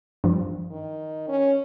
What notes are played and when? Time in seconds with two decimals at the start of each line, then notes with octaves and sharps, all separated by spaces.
0.24 G2 F3
0.71 D#3
1.28 C#4